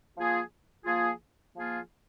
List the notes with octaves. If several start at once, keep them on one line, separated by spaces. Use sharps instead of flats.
F3 A#3 F4 G#4
F3 A#3 F4 G#4
F3 A#3 F4 G#4